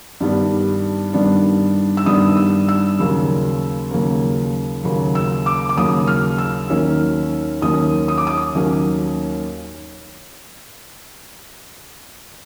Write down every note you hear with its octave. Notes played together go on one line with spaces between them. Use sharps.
G2 D#3 G3 B3 D4
G2 D#3 G3 B3 D4
E6
G2 D#3 G3 B3 D4 D#6
E6
E6
D#2 C#3 F#3 A#3
D#2 C#3 F#3 A#3
D#2 C#3 F#3 A#3
E6
D6
D6
D#2 C#3 F#3 A#3 D#6
F6
E6
D#2 D#3 F#3 A#3 C#4
D#2 D#3 F#3 A#3 C#4 D#6
D#6
D6
D#6
D#2 D#3 F#3 A#3 C#4